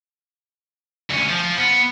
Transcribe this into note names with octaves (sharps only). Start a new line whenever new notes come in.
D2 C#4
F3
B3